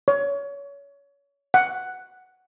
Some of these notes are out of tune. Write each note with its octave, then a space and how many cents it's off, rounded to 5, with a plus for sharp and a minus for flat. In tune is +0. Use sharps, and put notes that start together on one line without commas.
C#5 +25
F#5 +5